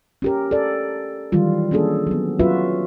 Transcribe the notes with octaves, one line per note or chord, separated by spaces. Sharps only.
C#4 G4 A#4
A4 D5
D#3 E3 F#3 G3 F4
A#3 C#4 D4 G#4 A4
F#3 B3
F#3 C#4 F4 F#4 B4 E5